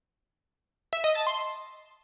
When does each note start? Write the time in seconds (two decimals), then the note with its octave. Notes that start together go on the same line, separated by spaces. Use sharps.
0.93 E5
1.04 D#5
1.15 A5
1.27 C6